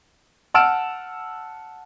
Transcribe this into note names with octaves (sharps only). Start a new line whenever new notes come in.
F#5 A5 E6 F6 D7 E7